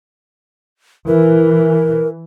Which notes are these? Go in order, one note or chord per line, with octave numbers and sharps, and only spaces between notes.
E3 A#4